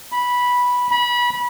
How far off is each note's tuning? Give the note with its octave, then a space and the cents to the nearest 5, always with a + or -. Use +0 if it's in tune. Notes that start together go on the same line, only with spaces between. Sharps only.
B5 -10
B5 -25